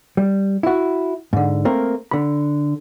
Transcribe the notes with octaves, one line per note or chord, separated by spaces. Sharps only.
G3
E4 F#4
G#2 D3
A3 A#3 C4 A#4
D3 B5